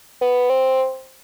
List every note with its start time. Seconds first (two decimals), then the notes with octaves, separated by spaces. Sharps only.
0.21 B3
0.50 C4